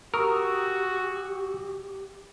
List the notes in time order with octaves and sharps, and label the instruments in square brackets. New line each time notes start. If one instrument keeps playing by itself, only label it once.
[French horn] F#4 [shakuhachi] G4 [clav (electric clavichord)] A#4 [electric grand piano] C#6 D#6 E6